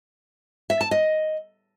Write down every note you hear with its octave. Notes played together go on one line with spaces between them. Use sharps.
E5
A5
D#5